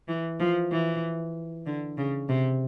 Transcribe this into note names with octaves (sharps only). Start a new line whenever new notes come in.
E3
F3
E3
D3
C#3
C3